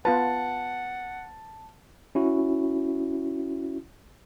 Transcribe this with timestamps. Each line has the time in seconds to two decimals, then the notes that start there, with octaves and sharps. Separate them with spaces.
0.05 B3 F4 B4 F#5 A5
2.15 C#4 E4 F#4